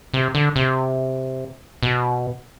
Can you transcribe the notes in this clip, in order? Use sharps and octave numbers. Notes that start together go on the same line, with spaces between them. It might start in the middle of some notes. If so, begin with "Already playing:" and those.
C3
D3
C3
B2